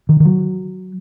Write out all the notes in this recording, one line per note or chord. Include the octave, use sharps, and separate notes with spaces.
D#3
D#3
F#3